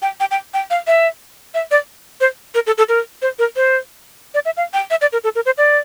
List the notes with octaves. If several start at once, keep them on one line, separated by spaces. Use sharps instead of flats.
G5
G5
G5
G5
F5
E5
E5
D5
C5
A#4
A4
A4
A#4
C5
A#4
C5
D5
E5
F5
G5
E5
D5
A#4
A4
A#4
C5
D5